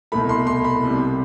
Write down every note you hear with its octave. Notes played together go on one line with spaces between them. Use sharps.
C2 B2 A3 B5
C6
C6
B5
C2 C3 G3